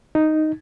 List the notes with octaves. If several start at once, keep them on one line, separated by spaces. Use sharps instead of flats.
D#4